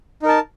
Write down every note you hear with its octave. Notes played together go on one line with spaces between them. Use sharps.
D#4 A#4 A5